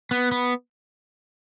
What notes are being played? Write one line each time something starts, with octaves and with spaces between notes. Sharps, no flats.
B3
B3